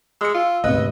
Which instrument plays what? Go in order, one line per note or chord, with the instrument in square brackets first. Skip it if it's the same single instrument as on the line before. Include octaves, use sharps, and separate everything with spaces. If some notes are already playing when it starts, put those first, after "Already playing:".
[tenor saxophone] G#3 [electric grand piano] E6 C#7
[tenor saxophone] F4
[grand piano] G#1 C4 [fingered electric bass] D2 C3 [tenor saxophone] B3 [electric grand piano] D#5